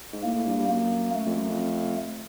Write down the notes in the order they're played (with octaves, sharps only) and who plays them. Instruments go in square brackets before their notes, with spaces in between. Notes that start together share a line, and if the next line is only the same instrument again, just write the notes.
[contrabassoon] G#2
[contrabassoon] A2 [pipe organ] A#3
[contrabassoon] A2
G2
G2
[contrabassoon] F#2 [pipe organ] A#3
[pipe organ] A3
[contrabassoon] F2
F#2
F2